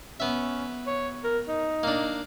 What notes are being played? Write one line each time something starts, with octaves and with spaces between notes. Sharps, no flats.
B3 C#4 E5
C#5
A#4
D#4
A#3 D4